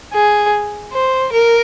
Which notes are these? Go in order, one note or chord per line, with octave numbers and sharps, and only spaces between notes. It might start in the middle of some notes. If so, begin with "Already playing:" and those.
G#4
C5
A#4